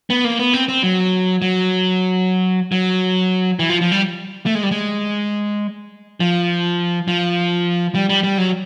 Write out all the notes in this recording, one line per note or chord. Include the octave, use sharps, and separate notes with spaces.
B3
A#3
B3
C4
C4
F#3
F#3
F#3
E3
F3
F3
G3
A3
G#3
G3
G#3
F3
F3
G3
G3
G3
F#3